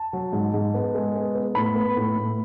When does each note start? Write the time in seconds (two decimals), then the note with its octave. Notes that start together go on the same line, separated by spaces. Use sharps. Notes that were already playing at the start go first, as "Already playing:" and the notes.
Already playing: A5
0.13 F#3
0.33 G#2
0.54 G#2
0.74 B3
0.95 G#3
1.15 B3
1.35 B3
1.55 A2 B5
1.75 B3
1.97 A2
2.16 A2